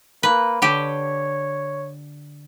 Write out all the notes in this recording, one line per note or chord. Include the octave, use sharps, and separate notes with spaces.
A#3 B4
D3 G4 C#5